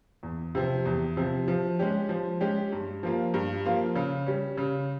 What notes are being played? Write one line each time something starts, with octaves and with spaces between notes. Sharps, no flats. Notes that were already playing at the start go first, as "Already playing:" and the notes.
E2
C3 F3 C4
E2
C3 F3 C4
F3
G#3 C#4 G4
F3
G#3 C#4 G4
G2
F3 A#3 F4
G2
F3 A#3 F4
C#3
G3 C#4
C#3